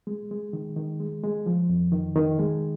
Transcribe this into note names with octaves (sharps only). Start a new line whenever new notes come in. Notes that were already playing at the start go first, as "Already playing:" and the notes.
G#3
G#3
D#3
D#3
G#3
G#3
F3
F2
D#3
D#3
G#3